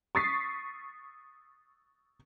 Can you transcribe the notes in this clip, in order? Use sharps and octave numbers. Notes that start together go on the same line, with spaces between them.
C#6 D#6 A6 B6 C7